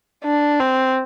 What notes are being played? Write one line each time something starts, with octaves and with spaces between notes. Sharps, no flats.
D4
C4